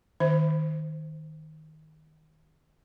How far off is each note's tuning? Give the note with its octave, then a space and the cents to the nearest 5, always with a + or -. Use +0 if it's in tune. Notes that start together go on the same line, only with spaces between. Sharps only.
D#3 +5 C5 +0 E5 +0